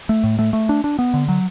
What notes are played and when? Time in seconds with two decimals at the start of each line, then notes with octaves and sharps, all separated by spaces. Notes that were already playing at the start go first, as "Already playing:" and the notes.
0.09 A3
0.24 A2
0.39 A3
0.53 A3
0.69 D4
0.84 D4
0.99 B3
1.14 D3
1.29 F#3